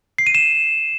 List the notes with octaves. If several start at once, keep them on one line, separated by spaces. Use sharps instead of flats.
C7
D#7
E7